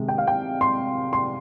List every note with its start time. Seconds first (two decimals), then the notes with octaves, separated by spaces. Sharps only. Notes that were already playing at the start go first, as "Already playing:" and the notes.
Already playing: C3 D#3 G#3
0.09 G5
0.18 F5
0.27 G5
0.61 C6
1.13 C6